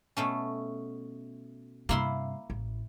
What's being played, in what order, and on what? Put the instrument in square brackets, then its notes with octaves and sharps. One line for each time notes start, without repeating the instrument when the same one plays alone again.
[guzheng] B2 A3 C#4
[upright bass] G2 C3 [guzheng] A#3 E4 C6
[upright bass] A1